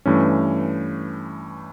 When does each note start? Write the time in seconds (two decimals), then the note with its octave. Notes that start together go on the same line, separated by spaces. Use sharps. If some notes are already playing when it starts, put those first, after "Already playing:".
0.06 G2 E3 A3 C#4